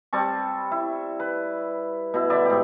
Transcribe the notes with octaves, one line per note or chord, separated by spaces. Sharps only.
G3 C4 A5 C#6
E4
B4
B2 E4
D3 D5 E5 B5
G#2 G4